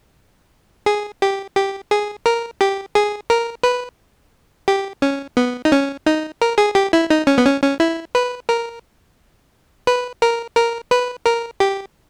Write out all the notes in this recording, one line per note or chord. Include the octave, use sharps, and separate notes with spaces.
G#4
G4
G4
G#4
A#4
G4
G#4
A#4
B4
G4
C#4
B3
D#4
C#4
D#4
A#4
G#4
G4
E4
D#4
C#4
B3
C#4
C#4
E4
B4
A#4
B4
A#4
A#4
B4
A#4
G4